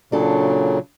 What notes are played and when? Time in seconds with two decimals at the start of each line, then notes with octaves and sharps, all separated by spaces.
0.12 A#2 C#3 F#3 D4 A4